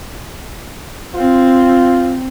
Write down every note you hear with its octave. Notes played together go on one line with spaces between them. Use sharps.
C4 F4